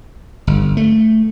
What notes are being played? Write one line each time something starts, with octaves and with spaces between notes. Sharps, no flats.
G1
A3